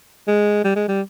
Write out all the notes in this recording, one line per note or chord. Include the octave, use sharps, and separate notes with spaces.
G#3
G3
G#3
G3